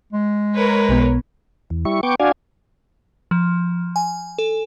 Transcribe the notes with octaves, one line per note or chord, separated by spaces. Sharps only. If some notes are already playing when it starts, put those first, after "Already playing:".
G#3
A#4 B4 C#5
B1 B2 B3
E2
G3 E4 C#6
B3 G5 C#6 D6
D4 F#4 D5 F5 G#5
F3
G#5
A4